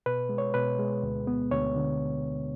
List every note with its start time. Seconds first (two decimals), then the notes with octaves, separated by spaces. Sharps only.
0.06 B2 B4
0.29 G#3
0.38 C#5
0.54 B2 B4
0.79 G#3
1.03 D2
1.27 B3
1.51 D2 C#5
1.76 D3